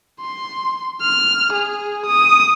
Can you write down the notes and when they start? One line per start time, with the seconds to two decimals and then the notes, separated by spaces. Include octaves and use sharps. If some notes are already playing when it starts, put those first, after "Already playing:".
0.21 C6
1.02 F6
1.53 G#4
2.06 D#6